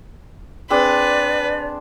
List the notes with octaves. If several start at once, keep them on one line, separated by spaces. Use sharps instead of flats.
C4 D4 G#4 B4 D5